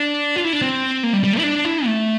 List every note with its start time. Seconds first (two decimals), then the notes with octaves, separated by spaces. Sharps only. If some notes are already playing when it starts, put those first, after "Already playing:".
Already playing: D4
0.36 F4
0.44 E4
0.53 D4
0.62 C4
1.03 A#3
1.13 G3
1.24 G3
1.33 A3
1.39 E4
1.43 D4
1.65 E4
1.86 A3